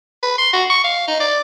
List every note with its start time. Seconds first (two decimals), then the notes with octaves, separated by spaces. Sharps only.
0.23 B4
0.38 C6
0.53 F#4
0.70 C#6
0.84 F5
1.08 D#4
1.20 D5